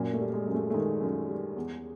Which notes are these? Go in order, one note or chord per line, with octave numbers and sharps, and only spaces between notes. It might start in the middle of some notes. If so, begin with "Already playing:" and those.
Already playing: F#2 A#2 A#3
A3
G3
G#3
F#2
A3
A3
D#3 G#3
F#2
G3
E2